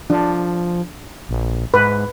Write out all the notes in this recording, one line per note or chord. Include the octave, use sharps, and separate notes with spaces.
F3 D4
A#1
G#2 B4